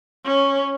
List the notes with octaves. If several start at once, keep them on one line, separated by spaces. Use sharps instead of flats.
C#4